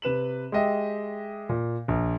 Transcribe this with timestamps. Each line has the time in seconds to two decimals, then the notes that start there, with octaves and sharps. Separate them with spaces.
0.02 C3 B4 E7 F#7
0.52 G#3 G4 D#5 E5
1.49 A#2
1.88 A#1